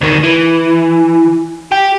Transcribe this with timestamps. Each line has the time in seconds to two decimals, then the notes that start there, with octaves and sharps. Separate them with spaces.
0.01 D2 D#3
0.24 E3
1.72 G4